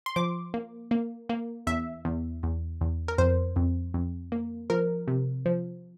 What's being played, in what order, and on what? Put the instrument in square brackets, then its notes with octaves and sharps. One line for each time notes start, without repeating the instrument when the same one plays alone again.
[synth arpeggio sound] C6
F3 D6
A#3
A#3
A#3
E2 E5
E2
E2
E2
A#4
F2 C5
F2
F2
A#3
F3 A#4
C3
F3